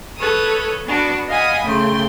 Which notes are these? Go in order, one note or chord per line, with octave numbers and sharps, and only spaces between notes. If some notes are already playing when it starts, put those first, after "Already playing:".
A4 B4 C#5 D#6
B3 D4 F#4
D#5 F5 F#5 G#5 B5 D#6
C#3 A3 G5 C6